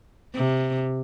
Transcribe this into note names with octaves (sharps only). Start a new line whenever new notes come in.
C3